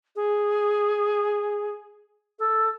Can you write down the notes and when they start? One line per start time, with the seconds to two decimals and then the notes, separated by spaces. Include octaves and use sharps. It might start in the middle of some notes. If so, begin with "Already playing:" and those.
0.16 G#4
2.39 A4